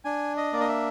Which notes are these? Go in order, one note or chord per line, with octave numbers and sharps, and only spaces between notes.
D4 G#5
D#5
A#3 D5
D#5
E5